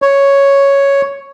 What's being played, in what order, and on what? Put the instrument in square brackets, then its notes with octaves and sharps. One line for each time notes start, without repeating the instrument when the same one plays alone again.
[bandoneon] C#5